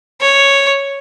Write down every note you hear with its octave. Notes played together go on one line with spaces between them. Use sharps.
C#5